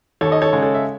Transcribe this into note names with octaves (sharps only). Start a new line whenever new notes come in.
D#2 A4 C#5
D#5
A4 C#5
C#3 G#3
A4 C#5
E5